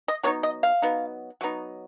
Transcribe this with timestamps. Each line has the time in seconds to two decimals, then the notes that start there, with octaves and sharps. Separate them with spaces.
0.08 D#5
0.23 F#3 B3 D#4 C#5
0.43 D#5
0.63 F5
0.82 F#3 B3 D#4
1.41 F#3 B3 D#4